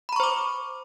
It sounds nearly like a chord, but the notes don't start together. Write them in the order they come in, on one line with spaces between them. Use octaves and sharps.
B5 A#5 C#6 C5 D6